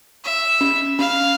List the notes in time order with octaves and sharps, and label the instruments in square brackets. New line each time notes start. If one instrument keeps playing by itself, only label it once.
[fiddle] E5
[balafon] C#4
[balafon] C#4 [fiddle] F5